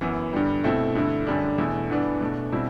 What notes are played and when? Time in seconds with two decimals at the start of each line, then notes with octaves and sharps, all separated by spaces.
0.01 F#2 E3 B3
0.33 G2 D3 G3
0.64 B2 A3 C4 E4
0.95 G2 D3 A3 E4
1.27 F#2 D3 G3 D4
1.58 E2 B2 A3 E4
1.90 G2 E3 B3 D4
2.21 B2 A3 D4
2.52 B2 G3 C4 E4